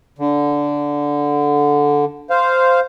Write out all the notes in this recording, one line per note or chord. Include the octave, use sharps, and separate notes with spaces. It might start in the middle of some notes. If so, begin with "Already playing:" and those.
D3
C5 F5